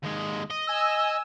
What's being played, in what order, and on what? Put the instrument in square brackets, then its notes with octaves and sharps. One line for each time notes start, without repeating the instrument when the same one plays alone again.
[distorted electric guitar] D#2 G#3
D#5
[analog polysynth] G#5 E6